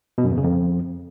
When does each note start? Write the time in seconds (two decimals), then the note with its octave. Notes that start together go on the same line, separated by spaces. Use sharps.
0.18 B2
0.24 F#2
0.31 E2
0.37 C#3
0.44 F2